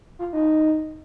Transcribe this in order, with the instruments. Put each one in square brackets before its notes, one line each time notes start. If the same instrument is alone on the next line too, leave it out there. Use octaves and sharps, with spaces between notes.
[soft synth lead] F4
D#4